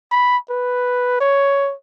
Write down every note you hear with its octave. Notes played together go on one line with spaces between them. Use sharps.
B5
B4
C#5